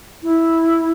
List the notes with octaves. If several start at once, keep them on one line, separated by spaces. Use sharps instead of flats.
E4